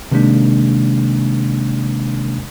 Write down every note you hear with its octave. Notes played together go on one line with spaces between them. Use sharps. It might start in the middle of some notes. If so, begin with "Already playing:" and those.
C3 D#3 G#3 A#3 D4